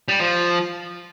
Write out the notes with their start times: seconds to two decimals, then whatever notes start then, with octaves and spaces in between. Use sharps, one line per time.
0.08 G3
0.20 F3